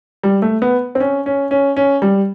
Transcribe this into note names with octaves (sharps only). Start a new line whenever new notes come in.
G3
A3
B3
C4
C#4
C#4
C#4
C#4
G3